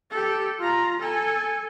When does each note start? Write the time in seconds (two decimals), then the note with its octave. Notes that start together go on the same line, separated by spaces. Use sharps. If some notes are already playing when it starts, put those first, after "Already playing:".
0.11 G4 A4
0.59 F4 A#5
0.99 A4 G#5